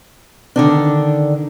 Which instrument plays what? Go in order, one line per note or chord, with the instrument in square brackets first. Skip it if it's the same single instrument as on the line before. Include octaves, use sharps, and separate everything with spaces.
[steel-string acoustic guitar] D3 D#3 D4